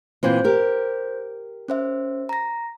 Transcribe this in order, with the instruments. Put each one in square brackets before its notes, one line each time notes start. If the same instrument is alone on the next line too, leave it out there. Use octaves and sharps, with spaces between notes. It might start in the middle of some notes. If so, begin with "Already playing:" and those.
[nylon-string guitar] A#2 E3 C4 [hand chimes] C5 G6
[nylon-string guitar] G4 A#4
[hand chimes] C#4 C5 E5
A#5 A#6